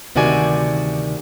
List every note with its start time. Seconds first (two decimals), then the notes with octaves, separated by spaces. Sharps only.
0.15 D2 C3 D#3 F#4 D5 G#5